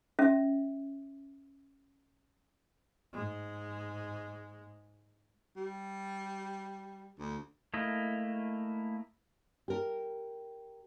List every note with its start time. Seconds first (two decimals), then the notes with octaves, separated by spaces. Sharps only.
0.19 C#4 E5
3.13 G#2 G#3
5.56 G3
7.19 D2
7.74 A3 A#3 E4 D#5
9.68 G4 A#4